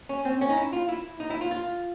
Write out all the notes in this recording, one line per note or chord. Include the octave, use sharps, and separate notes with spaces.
C#4
C4
C#4
D#4
E4
F4
E4
D#4
E4
F4
F4